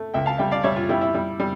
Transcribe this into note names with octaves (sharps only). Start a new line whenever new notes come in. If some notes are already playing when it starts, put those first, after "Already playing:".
Already playing: A3
C#2 E5 G5
F5 A5
G3 E5 G5
D5 F5
G3 C#5 E5
F4
G3 E4 G4
E4
G3
G3